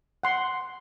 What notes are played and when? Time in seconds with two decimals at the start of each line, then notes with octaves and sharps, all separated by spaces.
0.23 F#5 C6